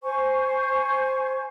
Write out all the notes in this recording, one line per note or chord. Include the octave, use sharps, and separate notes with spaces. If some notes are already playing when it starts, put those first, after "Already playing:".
C5 G#5 C#6